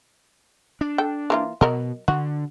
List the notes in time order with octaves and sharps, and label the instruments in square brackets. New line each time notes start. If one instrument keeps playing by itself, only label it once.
[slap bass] D4
[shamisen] A4 G5
E3 A#3 F4
[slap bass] B2 [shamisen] F#3 A#4 D#5
[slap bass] D3 [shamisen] F#4